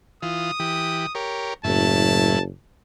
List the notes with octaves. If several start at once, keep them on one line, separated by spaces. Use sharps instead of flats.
E3 F4 D#6
E3 G4
G4 A#4 C#5
F#1 F#2 A2 E4 A5